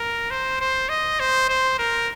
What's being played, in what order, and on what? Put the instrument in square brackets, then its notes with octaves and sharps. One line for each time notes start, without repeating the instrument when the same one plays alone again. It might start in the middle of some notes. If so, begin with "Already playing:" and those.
Already playing: [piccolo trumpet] A#4
C5
C5
D#5
C5
C5
A#4